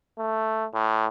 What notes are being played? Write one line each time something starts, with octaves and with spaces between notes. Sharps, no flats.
A3
A2